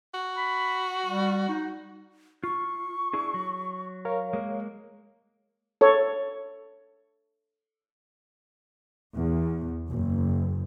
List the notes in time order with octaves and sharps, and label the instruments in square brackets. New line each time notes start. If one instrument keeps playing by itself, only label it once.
[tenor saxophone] F#4
[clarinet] B5
G3
D#4
[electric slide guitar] F4 [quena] C#6
[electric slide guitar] D4 E4 G#4
F#3
[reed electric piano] A#4 C#5 F5
[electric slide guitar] G#3 A#3
[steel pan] A4 C#5
[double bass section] E2
F#1